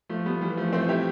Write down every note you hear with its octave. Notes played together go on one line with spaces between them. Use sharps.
F3 A3
G3 B3
E3 G3
F3 A3
A3 C4
E4 G4